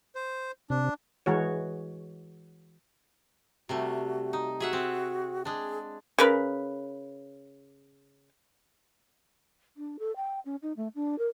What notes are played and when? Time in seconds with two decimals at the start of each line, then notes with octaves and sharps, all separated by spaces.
0.15 C5
0.70 C3 D4
1.26 E3 G#3 F#4 C#5
3.69 C3 G3 A3 F#4
4.33 D#4
4.60 F#4 G#4 E5 F#5
4.73 C4
5.45 G#3 D4 G#4
6.19 C#3 A#4 B4
9.77 D4
9.99 A4
10.16 G5
10.45 C#4
10.63 D#4
10.77 A3
10.95 D4
11.19 A#4